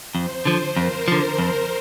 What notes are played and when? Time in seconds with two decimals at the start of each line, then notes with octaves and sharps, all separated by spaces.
0.15 F2 C5
0.45 D3 F3
0.76 F2 A#4
1.08 D3 F3
1.38 F2